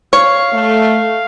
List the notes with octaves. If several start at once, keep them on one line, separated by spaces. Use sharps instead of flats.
C#5 F5
A3